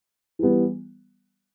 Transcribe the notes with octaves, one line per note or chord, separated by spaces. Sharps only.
E3 G3 B3